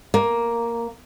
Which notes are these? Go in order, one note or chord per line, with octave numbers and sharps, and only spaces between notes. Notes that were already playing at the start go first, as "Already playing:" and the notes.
A#3